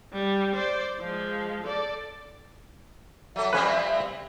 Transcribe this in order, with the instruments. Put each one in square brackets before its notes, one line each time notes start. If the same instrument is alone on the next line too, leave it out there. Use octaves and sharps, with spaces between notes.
[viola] G3
C5 D5
F3 G#3
A4 D5
[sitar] F#3 A4 [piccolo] E5
[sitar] F3 G3 C4 [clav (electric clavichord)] C#4 B4